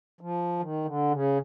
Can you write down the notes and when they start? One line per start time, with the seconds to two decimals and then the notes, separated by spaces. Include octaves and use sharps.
0.21 F3
0.59 D#3
0.85 D3
1.11 C#3